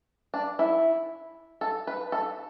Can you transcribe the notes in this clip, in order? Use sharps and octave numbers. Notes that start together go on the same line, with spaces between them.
D4
E4
A4
B4
A4